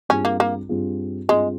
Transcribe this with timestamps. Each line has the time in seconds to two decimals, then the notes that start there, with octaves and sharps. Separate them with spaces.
0.09 G2 G3 C4 C#4 F4 G#4
0.25 A#3
0.40 A#3
0.69 G2 G3 C4 F4 G#4
1.28 G2 G3 G#3 C4 F4 G#4